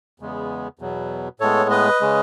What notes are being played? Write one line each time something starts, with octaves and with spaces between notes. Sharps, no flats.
E2 C#3 G#3 B3
E2 B2 F#3
A2 G#3 B3 A4 C#5
B4 D#5
C#3 G#3 C#4